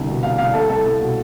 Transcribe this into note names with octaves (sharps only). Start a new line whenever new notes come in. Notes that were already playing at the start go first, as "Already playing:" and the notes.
Already playing: C2 D3
B2
C2 F5
C2 F5
C2 A4
C2 A4
C2 A4
B2